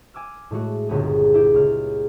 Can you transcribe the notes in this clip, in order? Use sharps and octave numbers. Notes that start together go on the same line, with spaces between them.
G#5 D6 E6 F6
A2 G#3 A3 F#4
G1 C#2 A#2 B3 G#4
E4 G4
C#2 F6